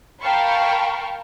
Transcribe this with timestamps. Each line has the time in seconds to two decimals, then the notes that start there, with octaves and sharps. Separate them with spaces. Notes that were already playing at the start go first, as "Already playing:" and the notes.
0.21 A#4 F5 G5 A5 B5 C#6